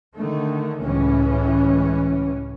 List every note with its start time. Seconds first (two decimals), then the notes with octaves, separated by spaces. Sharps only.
0.15 D3 D#3 A3
0.82 C#2 A2 E3 C#4